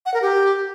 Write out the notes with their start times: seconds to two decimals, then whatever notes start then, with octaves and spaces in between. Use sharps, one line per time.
0.06 F#5
0.14 A#4
0.22 G4